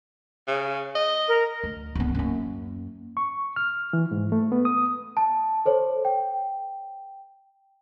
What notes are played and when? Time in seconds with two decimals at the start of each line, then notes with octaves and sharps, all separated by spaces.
0.48 C#3
0.95 D#5
1.28 A#4
1.63 D2
1.95 D1 B3
2.15 F#2 A#3
3.17 C#6
3.56 F6
3.93 E3
4.11 G#2
4.32 A3
4.52 B3
4.65 D#6
5.17 A5
5.66 A4 C5 C#5
6.05 G5